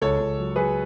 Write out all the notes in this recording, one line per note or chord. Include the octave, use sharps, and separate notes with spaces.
C#2 A4 C#5
C#2
F#3
F#3 G#4 B4